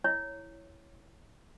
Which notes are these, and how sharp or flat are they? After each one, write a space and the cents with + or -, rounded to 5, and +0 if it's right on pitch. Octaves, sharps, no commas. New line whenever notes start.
E4 +0 C#5 +0